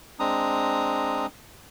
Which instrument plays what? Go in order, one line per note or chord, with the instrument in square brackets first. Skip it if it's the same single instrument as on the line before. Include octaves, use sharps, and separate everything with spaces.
[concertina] G#3 C4 D4 A#5 D#6